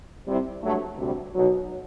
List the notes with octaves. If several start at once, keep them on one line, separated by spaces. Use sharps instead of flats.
C2 C3 G3 C4 E4
G2 F#3 A3
D2 C3 G3
B1 B2 F#3